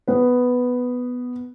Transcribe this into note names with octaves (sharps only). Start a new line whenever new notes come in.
B3 B4